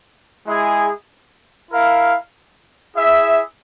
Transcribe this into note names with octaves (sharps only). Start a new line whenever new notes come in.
G#3 E4 G#4
E4 A#4 F5
E4 G#4 E5